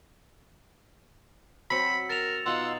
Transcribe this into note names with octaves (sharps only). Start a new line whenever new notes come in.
F#3 C4 C5 B5 E6 C#7
A#4 A6 E7 F7
B2 D#4 F4 F5 F#5 C6 E6